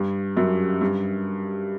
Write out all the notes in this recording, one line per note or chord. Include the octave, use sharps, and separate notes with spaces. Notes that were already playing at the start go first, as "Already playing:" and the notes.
Already playing: G2
F#2
G2